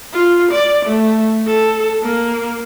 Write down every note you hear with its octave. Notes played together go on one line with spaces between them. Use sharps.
F4
D5
A3
A4
A#3